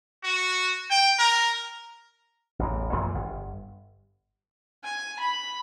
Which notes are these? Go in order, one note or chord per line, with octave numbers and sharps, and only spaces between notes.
F#4
G5
A#4
A1 E2
F#2 A#2 E3 F3
G1
G#5
B5